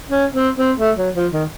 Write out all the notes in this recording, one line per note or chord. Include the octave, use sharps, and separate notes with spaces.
C#4
C4
C4
A3
F#3
F3
D#3